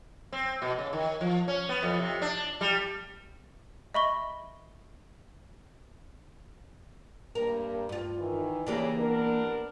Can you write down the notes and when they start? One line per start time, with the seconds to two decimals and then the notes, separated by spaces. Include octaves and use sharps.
0.33 C4
0.62 B2
0.78 C#3
0.93 D#3
1.21 F3
1.48 C#4
1.69 B3
1.83 F2
1.99 C3
2.22 D4
2.61 G3
3.94 D#5 E5 B5 C#6 G7
7.35 G2 A#3 A#4
7.89 G2 F4
8.18 D#3 E3
8.67 C#3 E3 A#3 D4 G4
8.99 B3 D4 A#4